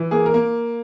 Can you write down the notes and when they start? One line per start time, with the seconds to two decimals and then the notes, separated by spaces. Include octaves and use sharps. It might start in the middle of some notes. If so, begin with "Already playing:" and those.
Already playing: E3
0.11 A#3 G#4
0.26 A#4
0.34 A#3